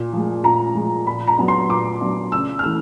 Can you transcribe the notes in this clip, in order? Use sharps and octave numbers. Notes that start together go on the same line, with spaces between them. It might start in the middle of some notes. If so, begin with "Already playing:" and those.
Already playing: A#2
F3 G#3
A#2 A#5
F3 G#3
A#2 B5
A#5
F#3 B3 D4
C6
A#2 D6
F#3 B3 D4
C#3 E6
F6
E3 A3 E6